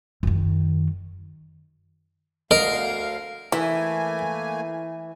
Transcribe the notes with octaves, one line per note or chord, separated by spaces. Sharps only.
F#2 D#3
D2 D3 A#4 D#5 F5
E3 A3 A#3 E4 G#5